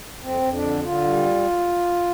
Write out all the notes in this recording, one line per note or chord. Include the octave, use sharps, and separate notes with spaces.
F2 C4
F2
D4
D3
D3 F4
G3